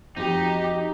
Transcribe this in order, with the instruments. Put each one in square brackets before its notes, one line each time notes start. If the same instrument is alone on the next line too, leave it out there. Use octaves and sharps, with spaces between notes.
[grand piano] F2 F#4 [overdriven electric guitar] D#4 [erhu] G4